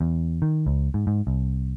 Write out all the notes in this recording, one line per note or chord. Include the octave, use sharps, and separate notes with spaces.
E2
D#3
C#2
G#2
G#2
C2